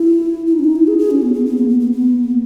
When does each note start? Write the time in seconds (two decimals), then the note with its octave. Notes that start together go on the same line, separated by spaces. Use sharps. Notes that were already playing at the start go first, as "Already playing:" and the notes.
Already playing: E4
0.46 E4
0.53 D#4
0.59 C#4
0.64 D#4
0.76 E4
0.87 G#4
0.99 G#4
1.11 C#4
1.22 B3
1.34 B3
1.46 B3
1.57 A#3
1.69 B3
1.80 B3
1.92 B3
2.24 A#3